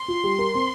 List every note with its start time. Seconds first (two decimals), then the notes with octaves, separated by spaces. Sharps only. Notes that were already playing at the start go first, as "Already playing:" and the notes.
Already playing: C6
0.08 F4
0.24 G3
0.39 A#4
0.54 C4